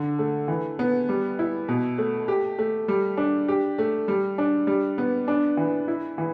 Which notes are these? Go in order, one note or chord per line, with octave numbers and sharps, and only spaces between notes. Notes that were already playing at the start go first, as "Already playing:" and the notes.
Already playing: D3
A3
E3
B3
G3
E4
B2
A3
G4
A3
G3
D4
G4
A3
G3
D4
G3
B3
D4
E3
E4
E3